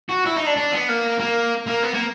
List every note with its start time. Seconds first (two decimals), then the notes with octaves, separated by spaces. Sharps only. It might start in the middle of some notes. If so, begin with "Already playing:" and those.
0.09 F#4
0.25 E4
0.36 D#4
0.46 D4
0.56 D4
0.73 B3
0.89 A#3
1.20 A#3
1.68 A#3
1.84 B3
1.94 A#3